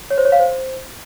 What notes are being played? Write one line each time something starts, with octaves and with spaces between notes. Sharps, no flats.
C#5
C5
C#5
F5
C5